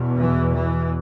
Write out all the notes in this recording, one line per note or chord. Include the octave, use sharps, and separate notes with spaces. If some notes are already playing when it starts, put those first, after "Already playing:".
Already playing: E2 B2
E3
E3